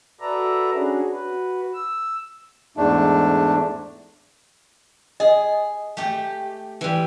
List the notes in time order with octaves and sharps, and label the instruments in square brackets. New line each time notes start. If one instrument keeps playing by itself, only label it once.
[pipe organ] F#4 A4 B4 D5 E5 A#5
C#4 D4 F#4 G#4
F#4 B4
E6
[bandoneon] E2 G#2 A3 D4
[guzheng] G#4 [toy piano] D#5
[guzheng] A3 G4
E3 G3